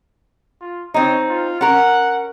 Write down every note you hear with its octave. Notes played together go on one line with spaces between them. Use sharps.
F4
C4 D#4 C#5
F4
C#4 A#4 F#5